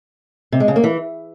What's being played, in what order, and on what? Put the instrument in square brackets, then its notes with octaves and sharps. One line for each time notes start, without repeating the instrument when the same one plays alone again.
[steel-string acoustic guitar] C3
G#3
C#3
A#3
E3